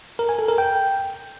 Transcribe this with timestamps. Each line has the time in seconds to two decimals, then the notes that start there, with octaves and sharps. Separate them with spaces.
0.19 A#4
0.29 G#5
0.39 A4
0.48 A#4
0.58 G5